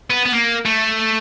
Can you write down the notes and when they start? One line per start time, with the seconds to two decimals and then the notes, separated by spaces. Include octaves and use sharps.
0.10 B3
0.25 B3
0.32 A#3
0.66 A3